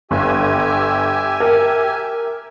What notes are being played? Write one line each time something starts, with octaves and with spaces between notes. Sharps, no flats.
G1 G4 E5 G#5
A#4